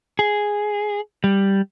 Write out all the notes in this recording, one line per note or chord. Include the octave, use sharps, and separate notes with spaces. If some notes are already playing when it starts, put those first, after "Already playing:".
G#4
G3